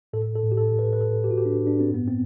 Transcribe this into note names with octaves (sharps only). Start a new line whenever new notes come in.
A2 A4
A4
A2
G4
A4
A2
B4
B4
A2 A4
G4
A2 F#4
G4
D4
A2
D4
C4
G2 B3
C4